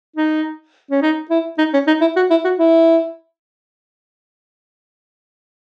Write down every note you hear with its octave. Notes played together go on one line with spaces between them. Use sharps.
D#4
C#4
D#4
E4
D#4
C#4
D#4
E4
F#4
E4
F#4
E4